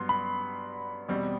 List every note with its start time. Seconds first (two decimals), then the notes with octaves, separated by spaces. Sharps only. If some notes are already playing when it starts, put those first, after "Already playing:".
Already playing: G2 F#3 B3 C6
0.09 B5
1.08 E2 B2 G3 C4